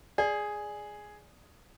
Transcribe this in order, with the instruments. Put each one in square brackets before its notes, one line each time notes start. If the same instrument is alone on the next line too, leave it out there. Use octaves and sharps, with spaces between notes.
[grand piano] G#4 [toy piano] D5